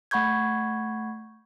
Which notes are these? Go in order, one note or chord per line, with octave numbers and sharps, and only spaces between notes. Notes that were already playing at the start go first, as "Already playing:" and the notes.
A3 F#5 B5 C#6 G6 G#6